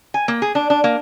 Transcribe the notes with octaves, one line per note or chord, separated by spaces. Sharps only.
G#5
A#3
G#4
D4
D4
A#3